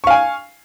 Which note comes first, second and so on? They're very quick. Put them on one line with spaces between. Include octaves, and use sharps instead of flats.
C#6 F5 G#5